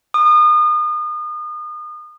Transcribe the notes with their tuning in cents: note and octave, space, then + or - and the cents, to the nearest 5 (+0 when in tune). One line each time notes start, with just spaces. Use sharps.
D#6 -35